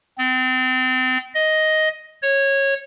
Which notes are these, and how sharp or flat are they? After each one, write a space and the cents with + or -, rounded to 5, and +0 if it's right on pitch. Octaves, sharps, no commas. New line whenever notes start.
C4 -35
D#5 +5
C#5 -15